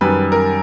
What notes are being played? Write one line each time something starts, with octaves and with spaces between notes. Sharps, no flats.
F#2 D#3 G3 B4
A#4